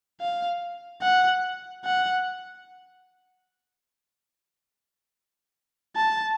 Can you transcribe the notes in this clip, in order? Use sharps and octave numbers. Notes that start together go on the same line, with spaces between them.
F5
F#5
F#5
A5